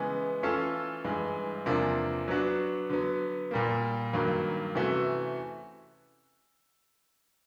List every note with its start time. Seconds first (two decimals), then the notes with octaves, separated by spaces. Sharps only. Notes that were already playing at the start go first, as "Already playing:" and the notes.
Already playing: C#3 E3 G#3 B3
0.43 E3 A3 C#4 F4 A4
1.05 G2 E3 G#3
1.66 E2 C3 F3 A#3 D4
2.28 F#3 B3 D4 F#4
2.90 D3 F#3 B3
3.51 A#2 G3 A#3
4.13 G2 D#3 F#3 A#3
4.75 C3 E3 A3 C#4 F#4